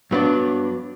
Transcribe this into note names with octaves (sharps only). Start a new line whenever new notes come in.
G2 F#3 B3 D4